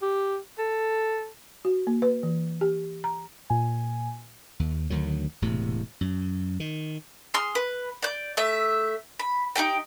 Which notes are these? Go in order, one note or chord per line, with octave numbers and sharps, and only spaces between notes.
G4
A4
F#4
A#3
B4
E3
G4
A#5
A#2 G#5
D#2
D2 D#3 F#3
E1 A2 C3
F#2
D#3
G#4 C6 F6
B4
D5 G6
A3 E5
B5
D#4 F4 G4 G5